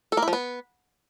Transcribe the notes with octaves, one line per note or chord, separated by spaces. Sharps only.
A4
A#3
E4
F3
B3